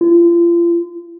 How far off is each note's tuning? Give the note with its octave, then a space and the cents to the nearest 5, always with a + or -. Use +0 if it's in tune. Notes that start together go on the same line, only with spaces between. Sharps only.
F4 -35